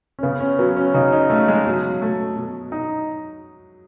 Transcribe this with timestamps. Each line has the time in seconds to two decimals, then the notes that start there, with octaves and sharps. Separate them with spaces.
0.19 C#4
0.23 C#3 B3
0.41 C#4
0.59 F#3 B3
0.76 C#4
0.94 C#3 D#4
1.12 D#4
1.30 A3 C#4
1.48 G#3
1.65 B2 F#3
2.02 A3
2.36 B2
2.72 D#4